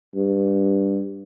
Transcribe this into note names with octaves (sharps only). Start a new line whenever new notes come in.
G2